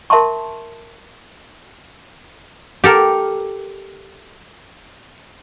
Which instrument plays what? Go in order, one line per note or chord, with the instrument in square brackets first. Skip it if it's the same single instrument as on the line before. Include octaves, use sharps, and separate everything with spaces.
[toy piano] A#4 E5 A5 C6 C#6
[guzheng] G4 A4 A#4